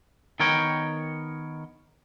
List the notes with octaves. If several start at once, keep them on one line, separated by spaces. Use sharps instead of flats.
D#3 B3 A#4 C#5 G5